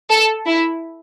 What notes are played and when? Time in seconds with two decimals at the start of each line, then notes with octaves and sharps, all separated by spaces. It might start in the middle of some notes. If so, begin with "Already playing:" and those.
0.10 A4
0.47 E4